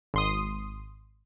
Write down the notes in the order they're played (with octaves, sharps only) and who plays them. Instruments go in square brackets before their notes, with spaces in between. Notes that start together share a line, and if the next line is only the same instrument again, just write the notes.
[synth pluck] G#1 C6 D#6